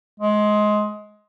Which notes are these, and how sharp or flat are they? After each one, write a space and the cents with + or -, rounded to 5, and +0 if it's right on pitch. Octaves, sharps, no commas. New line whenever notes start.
G#3 +20